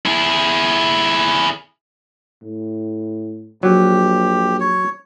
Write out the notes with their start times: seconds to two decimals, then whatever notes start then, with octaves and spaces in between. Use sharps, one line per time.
0.06 E4 G#4
2.42 A2
3.63 A#1 F#3 G4
4.60 C#5